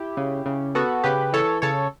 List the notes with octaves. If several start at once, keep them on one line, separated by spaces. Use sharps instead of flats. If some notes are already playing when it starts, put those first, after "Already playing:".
Already playing: E4 G4
C#3
C#3
B3 F#4 A4
C#3 G4 B4
E3 A4 C#5
C#3 A4 C#5